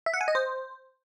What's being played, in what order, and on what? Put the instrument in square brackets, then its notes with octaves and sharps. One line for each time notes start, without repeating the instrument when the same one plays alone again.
[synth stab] E5
F#5
G#5
D#5
C5